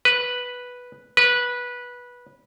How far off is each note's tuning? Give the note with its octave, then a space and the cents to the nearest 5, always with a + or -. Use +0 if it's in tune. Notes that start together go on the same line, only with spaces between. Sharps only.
B4 -5
B4 -15